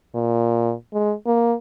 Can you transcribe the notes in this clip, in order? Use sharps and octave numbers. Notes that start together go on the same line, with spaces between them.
A#2
G#3
A#3